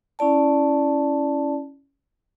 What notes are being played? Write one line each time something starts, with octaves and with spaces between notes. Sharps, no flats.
C#4 E4 D5 A5